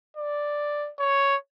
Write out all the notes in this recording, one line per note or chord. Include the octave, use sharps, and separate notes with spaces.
D5
C#5